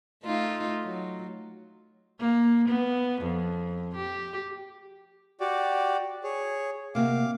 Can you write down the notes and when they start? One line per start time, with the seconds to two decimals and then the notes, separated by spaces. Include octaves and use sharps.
0.24 A3 D#4 F4
0.84 F#3
2.20 A#3
2.68 B3
3.22 F2
3.95 G4
5.40 F#4 G4 D5
6.24 G#4 C#5
6.95 C3 A#3 F#4 F5 D6